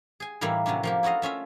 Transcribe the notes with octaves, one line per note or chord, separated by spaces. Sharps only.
G#4 G#5
A2 E3 G3 A#3 D#4 E4
C3 F#3 C#4 D4
F3 A#3 G4
E4 F#4 A4 D#5 F5
A3 C#4 F4 E5